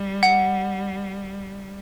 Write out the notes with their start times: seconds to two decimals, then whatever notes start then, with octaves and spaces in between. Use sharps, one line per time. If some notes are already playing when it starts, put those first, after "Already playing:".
Already playing: G3
0.23 F#5